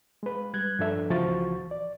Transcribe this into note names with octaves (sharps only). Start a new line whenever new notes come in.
G#3 B4
G3 F#6 G#6
G2 F3 D4 A4 E5
C#2 E3 F3 F#4 C#6 A6
D5